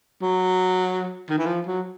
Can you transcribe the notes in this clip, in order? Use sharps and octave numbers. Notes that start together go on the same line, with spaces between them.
F#3
D#3
E3
F3
F#3